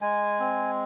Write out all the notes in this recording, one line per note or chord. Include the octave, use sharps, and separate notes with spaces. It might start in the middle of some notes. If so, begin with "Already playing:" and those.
G#3 G#5
C4